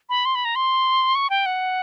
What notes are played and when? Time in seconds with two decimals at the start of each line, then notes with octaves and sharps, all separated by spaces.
0.09 B5
0.25 C6
0.35 B5
0.45 A#5
0.56 C6
1.15 C#6
1.30 G5
1.46 F#5